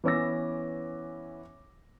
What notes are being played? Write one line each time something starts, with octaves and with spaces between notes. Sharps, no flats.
E3 B3 C#4 D6 E6 A#6